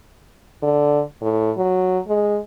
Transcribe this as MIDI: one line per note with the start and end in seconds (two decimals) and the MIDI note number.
0.63 1.01 50
1.22 1.52 45
1.57 1.99 54
2.08 2.39 56